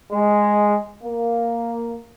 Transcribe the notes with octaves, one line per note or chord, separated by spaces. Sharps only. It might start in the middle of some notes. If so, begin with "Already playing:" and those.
G#3
A#3